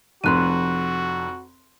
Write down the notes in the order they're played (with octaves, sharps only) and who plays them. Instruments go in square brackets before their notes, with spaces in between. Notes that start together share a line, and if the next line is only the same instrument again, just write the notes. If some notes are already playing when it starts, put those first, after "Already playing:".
[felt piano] F1 F2 [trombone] F#4 [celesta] C6 F#6 D#7